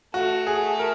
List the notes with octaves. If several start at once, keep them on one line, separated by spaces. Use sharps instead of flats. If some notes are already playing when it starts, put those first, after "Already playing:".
A3 F#4
G#4
A#4